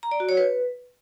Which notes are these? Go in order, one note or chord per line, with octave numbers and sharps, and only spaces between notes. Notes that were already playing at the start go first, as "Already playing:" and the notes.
A#5
D5
F#4
C#5
B4